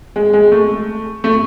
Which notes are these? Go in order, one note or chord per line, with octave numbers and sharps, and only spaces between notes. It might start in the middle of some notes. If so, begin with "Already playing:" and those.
G#3
G#3
A3
A3